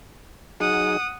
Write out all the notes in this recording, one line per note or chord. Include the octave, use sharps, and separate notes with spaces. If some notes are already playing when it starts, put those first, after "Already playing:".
F#3 D#4 G#4 F#5 D#6